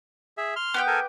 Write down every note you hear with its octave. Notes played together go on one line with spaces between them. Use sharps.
G#4 E5
C6 F6
B3 G4 G5
A4 A#4 G#5